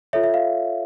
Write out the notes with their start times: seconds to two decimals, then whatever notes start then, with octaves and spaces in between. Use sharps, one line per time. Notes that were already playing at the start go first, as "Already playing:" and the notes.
0.13 F4 A4 C#5 E5
0.24 E5
0.34 F5